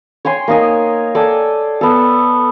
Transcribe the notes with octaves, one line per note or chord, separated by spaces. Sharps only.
C#5 G5 G#5 C6
A#3 D#4 G#5
A4 D5 G5 G#5
B3 A4